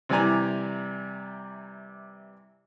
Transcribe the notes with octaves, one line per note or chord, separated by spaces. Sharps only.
C3 E3 G3 D5 G#5 A#5